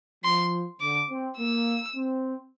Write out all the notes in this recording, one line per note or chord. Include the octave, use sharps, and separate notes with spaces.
F3 C6
D3 D6
C4
A#3 E6
C4